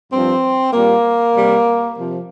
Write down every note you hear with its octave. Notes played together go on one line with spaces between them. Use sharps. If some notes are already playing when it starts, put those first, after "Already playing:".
G2 F3 C4
A#2 G3 A#3
C3 G3
C3 F3